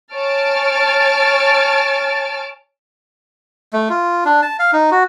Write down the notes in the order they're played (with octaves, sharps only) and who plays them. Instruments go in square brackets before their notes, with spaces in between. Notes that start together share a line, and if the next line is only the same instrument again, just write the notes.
[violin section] C#5 G#5 A5 F6 A6 D7
[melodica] A3
F4
D4
A5
F5
D#4
F#4